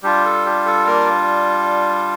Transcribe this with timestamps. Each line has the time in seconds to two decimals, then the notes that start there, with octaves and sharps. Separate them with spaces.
0.03 G3 D4 F4 G4
0.25 A4
0.46 G4
0.66 A4
0.86 A#3 A#4